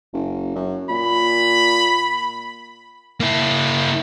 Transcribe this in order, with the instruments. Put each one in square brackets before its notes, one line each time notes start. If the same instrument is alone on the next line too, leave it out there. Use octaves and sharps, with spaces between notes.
[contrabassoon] F#1
F#2
[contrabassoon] A#2 [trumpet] B5
[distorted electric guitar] A#3 E4